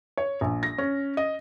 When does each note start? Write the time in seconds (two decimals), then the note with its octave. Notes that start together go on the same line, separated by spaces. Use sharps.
0.17 C#5
0.41 A#1
0.63 A#6
0.78 C#4
1.17 D#5